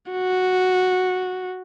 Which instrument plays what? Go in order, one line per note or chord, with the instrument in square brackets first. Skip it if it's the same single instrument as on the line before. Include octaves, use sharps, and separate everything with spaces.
[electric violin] F#4